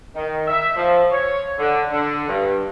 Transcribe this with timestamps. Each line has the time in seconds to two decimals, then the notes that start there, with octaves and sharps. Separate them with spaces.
0.15 D#3
0.48 E5
0.76 F3
1.11 C#5
1.59 D3
1.92 D3
2.28 G2